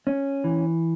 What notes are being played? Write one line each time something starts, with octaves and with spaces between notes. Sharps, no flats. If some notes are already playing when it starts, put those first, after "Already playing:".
C#4
E3